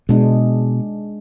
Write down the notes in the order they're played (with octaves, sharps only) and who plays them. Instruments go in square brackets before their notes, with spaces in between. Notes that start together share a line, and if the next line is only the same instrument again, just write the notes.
[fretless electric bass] B2 [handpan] G#3 D4